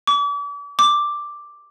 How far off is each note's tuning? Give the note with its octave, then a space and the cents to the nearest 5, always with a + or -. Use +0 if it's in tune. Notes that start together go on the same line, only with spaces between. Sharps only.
D6 -40
D6 +5